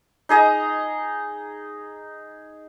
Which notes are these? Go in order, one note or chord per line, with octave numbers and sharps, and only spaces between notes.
D#4 G#4 D#5 A#5